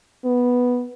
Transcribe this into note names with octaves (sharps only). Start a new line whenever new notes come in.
B3